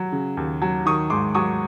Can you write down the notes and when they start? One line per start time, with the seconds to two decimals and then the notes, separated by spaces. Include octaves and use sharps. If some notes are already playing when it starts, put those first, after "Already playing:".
Already playing: F#3
0.12 C#3
0.37 D#2
0.62 F#3
0.86 D#3 C#6 D#6
1.10 G#2 C6 D6
1.35 F#3 C#6 D#6